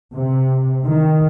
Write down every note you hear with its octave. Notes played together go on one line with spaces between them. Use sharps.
C3
D#3